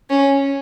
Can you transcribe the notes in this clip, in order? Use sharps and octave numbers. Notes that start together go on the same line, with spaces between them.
C#4